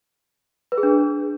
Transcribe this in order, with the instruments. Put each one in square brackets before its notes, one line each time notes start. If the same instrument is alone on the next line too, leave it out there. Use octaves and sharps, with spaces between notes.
[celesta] B4
G#4
D4